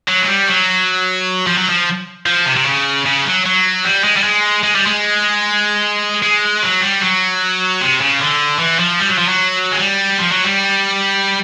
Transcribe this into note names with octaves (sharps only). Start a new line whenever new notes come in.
F#3
G#3
G3
F#3
F3
F#3
F3
F3
C3
C3
C#3
C#3
F#3
F#3
G3
G#3
G3
G#3
G#3
G3
G#3
G#3
F#3
G3
F#3
C3
C#3
D3
E3
F3
G3
F#3
F3
F#3
G#3
G3
F3
F#3
G3